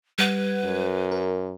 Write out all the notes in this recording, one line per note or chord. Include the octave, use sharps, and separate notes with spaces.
G3 B4 F#5 G#6
F#2
A#4